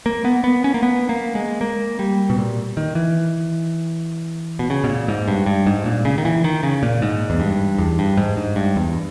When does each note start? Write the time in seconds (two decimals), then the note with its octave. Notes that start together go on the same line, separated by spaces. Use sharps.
0.06 A#3
0.25 B3
0.44 B3
0.64 C#4
0.74 A#3
0.83 B3
1.09 A#3
1.35 G#3
1.61 A#3
1.99 G3
2.30 B2
2.38 A#2
2.77 D#3
2.95 E3
4.59 B2
4.70 C#3
4.84 B2
4.89 A#2
5.08 G#2
5.28 G2
5.46 G2
5.67 G#2
5.85 A#2
6.05 C#3
6.18 D#3
6.25 E3
6.44 D#3
6.63 C#3
6.83 A#2
7.02 G#2
7.30 E2
7.40 G2
7.78 E2
7.99 G2
8.17 G#2
8.37 G#2
8.56 G2
8.76 E2